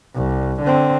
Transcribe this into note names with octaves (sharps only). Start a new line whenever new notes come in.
C2
D3 C4